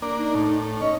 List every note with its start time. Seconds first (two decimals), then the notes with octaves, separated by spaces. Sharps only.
0.02 A#3 D4
0.17 D#4
0.35 A2
0.81 C#4 D#5